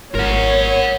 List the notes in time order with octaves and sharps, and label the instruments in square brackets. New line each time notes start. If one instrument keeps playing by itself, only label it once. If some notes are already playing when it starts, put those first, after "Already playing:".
[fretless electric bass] G#1 [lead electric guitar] A#4 F#5 [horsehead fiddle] C#5